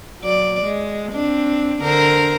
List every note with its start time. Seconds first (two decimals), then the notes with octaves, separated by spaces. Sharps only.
0.21 F#3 D5
0.64 G#3
1.12 C4 D4
1.82 D3 A#4 C5